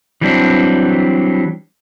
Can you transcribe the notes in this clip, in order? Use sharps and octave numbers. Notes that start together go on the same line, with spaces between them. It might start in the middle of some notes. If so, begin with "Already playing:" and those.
E3 F#3 G3 C4 D4